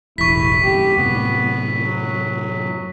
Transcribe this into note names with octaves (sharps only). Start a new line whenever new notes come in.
E1 A1 E4 C#6 B6
G2 C#3 G4
F#2 A2 C3 B3
F#3